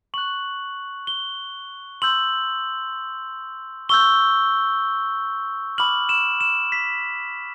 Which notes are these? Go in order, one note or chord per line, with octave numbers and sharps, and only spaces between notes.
C#6 F#6 F#7
G7
C6 E6 G6 F#7
C#6 E6 G6 G7
B5 D6 F6 F#7
E7
E7
B6